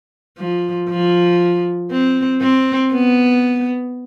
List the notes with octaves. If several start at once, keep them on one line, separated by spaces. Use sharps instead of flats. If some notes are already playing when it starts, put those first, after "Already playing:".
F3
F3
C4
C4
B3